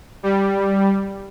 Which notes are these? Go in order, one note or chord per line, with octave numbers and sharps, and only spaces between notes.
G3